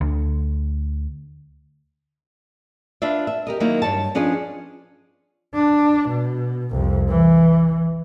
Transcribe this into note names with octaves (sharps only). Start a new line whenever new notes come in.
D2
D4 F4 B4 D5 E5
E5
G4 A#4 D#5
D#3 F#3 A#3 D#4 E4
G2 G3 C#5 A5
F3 C#4 D4 G#4 B4 D#5
D4
B2
C2 F2
E3